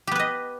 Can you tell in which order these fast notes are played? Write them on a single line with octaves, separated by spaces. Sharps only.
G4 B3 B4 D#5